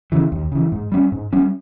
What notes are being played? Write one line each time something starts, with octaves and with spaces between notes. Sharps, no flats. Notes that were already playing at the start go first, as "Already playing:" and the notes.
C#3 E3
D#2
C#3 E3
G#2
G3 C#4
G#2
G3 C#4